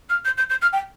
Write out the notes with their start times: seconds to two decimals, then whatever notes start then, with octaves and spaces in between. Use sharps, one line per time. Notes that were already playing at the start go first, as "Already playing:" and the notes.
0.09 F6
0.25 G6
0.37 G6
0.49 G6
0.61 F6
0.73 G5